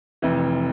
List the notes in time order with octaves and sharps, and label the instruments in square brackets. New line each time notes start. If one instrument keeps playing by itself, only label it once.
[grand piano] F1 F2 E3